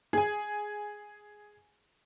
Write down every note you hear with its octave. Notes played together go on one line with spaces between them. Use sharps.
G#4 G#5